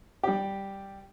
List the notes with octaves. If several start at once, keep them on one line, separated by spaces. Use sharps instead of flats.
G3 G4